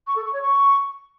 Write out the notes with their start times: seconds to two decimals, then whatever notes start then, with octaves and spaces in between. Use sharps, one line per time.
0.07 C#6
0.16 A4
0.25 C#6
0.33 C#5
0.42 C#6